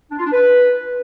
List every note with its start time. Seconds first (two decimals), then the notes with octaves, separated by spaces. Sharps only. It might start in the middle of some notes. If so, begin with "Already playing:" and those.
0.11 D4
0.18 F4
0.25 D4
0.33 B4